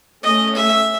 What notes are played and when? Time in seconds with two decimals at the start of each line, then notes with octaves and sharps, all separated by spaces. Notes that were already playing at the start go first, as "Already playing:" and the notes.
0.23 A3 C#4 D#5
0.55 E5